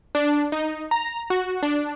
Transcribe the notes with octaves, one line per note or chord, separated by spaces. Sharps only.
D4
D#4
A#5
F#4
D4